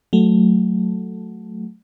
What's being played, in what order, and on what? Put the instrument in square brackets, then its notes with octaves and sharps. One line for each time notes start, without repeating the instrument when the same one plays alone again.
[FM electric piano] F#3 A3